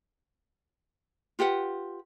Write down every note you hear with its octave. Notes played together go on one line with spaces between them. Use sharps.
F4 G4 B4 F#5